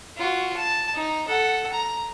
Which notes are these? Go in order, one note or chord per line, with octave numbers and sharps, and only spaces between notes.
F4 F#4
A5
D#4
A4 F#5
A#5